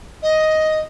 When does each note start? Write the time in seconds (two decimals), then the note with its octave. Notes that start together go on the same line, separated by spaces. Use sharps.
0.22 D#5